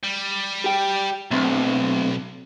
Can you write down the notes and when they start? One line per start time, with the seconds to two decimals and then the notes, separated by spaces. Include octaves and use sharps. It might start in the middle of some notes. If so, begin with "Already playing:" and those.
0.04 G3
0.64 G4 G5
1.31 B1 F#3 A3 C4